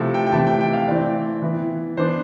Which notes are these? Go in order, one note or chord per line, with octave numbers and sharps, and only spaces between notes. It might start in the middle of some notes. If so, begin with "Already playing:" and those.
Already playing: C3 F3 A3 E4 A4
G5
G5
C3 E3 A3 E4 A5
G5
G5
F5
E3 A3 C4 E4 D5
E3 B3 E4
E3 B3 D4 C5